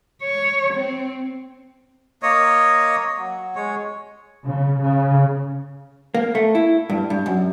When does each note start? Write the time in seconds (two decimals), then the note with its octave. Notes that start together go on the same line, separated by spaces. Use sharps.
0.22 C#5
0.74 C4
2.23 A#3 C#5 D#5
3.18 F#3
3.55 G#3 C#5
4.46 C#3
4.83 C#3
6.14 A#3
6.35 A3
6.55 E4
6.90 G2
7.10 G2
7.26 F#2